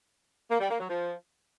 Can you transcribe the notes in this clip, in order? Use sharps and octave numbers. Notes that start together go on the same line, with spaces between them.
A#3
G3
A#3
F#3
F3